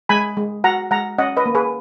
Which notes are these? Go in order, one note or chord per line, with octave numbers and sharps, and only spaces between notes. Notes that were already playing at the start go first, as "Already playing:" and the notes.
G#3 G#5 B5
G#3
F#4 F#5 A#5
G#3 F#5 A#5
C#4 D#5 F#5
B4 D#5
A#3
G#4 B4